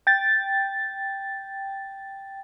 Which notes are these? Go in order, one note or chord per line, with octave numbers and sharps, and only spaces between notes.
G5 A6